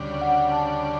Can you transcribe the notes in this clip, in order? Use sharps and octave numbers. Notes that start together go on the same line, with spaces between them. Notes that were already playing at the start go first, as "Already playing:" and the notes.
Already playing: D2 C#3 G3 D4
F#5
A5